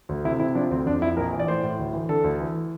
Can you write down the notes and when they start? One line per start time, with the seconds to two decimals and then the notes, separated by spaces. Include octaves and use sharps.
0.09 D2
0.25 C3 E4
0.39 C3 E4
0.55 F3 D4
0.71 D2 C4
0.86 F2 D4
1.01 F2 E4
1.17 A#1 A#4
1.33 E3
1.39 D5
1.47 A2 C5
1.64 A2
1.79 D2
1.93 E3
2.09 D3 A4
2.24 D2
2.40 E3